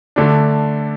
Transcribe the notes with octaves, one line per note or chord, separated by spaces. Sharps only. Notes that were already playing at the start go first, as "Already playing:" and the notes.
D3 A3 D4